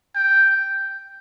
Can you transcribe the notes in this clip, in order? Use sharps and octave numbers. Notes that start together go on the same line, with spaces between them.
G5